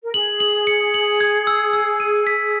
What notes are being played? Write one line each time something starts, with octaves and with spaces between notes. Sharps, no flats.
A#4
G#4 F#7
F#7
C#7
F#7
G#6
E6
E6
D#7
B6